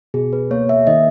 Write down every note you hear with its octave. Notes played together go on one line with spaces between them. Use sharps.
B2 G#4
B4
A#3 C#5
E5
D#3 D#5